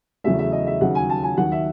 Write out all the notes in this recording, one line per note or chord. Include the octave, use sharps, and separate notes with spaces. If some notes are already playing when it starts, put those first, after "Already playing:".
E2 C#3 F#3 A3 E5
E5
D#5
E5
D#2 C#3 F#3 F#5
G#5
A5
G#5
D#2 D#3 F#3 F#5
E5